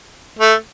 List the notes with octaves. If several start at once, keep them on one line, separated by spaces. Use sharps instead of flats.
A3